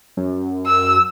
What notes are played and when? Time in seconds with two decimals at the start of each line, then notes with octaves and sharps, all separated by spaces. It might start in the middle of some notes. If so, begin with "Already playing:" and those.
0.17 F#2
0.66 E6